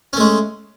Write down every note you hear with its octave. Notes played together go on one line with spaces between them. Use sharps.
G#3 A3 C#4